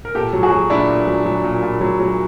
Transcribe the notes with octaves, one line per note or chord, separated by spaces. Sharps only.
A#4
A#2 G4 A4
F#3
F#4 G#4
F#3
A#2 D4 E4
A#2
F#3
F#3
A#2
A#2
F#3
F#3